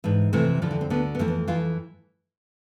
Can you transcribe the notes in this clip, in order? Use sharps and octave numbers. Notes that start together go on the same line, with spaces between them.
G#2 E3 D4
F2 C3 E3 A3
F2 D3 F3
E3
C4
D2 D3 B3
B3
F2 E3 A3
B3
F2 E3 F4